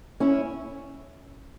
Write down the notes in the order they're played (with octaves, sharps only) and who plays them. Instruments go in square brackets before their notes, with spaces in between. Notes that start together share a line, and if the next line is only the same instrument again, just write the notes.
[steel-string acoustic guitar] C#4 E4